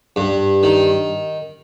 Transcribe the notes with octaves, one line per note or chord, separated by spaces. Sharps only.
G2
D#3